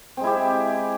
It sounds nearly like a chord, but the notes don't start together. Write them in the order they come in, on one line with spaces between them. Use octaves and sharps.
C4 G#3 E4 G4